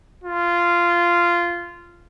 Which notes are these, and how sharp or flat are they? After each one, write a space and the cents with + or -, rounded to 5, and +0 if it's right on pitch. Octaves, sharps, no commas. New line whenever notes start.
F4 -10